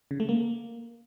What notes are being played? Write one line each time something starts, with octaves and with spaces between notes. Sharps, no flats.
C#3
A3
A#3